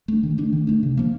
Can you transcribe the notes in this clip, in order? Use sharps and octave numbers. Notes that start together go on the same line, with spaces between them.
A3 D4
D#3
A3 D4
D#3
A3 D4
C3
F3 A#3